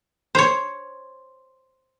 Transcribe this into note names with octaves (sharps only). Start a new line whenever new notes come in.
C5 C#5